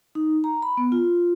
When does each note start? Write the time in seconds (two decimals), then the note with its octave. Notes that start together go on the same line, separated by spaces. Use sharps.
0.15 D#4
0.44 A#5
0.62 B5
0.77 B3
0.92 F4